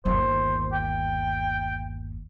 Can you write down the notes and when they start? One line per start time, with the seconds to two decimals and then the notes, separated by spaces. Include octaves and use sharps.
0.05 G1 D#2 C5
0.73 G5